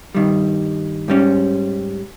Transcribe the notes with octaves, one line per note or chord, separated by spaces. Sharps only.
G2 D#3 G3
G#2 G3 C#4